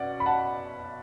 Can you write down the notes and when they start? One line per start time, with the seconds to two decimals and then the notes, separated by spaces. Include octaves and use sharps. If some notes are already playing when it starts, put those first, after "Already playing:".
Already playing: B2 C#4 D5 F#5
0.20 B5
0.26 F#5 A5